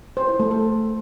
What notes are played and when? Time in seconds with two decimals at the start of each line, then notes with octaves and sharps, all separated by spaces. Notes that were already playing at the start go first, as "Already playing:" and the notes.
0.17 C5
0.28 E4
0.40 A3
0.51 A4